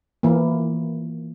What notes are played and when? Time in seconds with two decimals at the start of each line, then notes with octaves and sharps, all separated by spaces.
0.23 E3 A#3